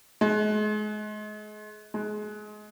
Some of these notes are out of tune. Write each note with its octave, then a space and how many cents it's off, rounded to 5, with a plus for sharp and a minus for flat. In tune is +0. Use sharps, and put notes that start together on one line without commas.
G#3 +35
G#3 +25